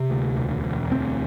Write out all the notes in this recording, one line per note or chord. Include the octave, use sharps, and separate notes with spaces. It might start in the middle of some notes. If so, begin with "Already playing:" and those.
Already playing: C3
D2
E1
E1
D2 C4